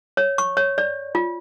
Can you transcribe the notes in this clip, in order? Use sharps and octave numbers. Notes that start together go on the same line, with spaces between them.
C#5
C#6
C#5
D5
F4